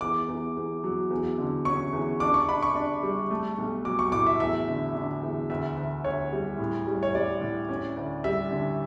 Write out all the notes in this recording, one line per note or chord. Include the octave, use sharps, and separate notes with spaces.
E2 D6
E2
E2
F#3
E2
D3
C#4 C#6
E2
D4 D6
C#6
D4 B5
C#6
D4
G3
A3
B1
F#3 D6
C#6
A2 D6
E5
E2 E5
D3
D3
E2
D2 E5
D2
D2 C#5
G3
A2
G3
C#5
G3 D5
A2
C#4
D2
G3 E5
D3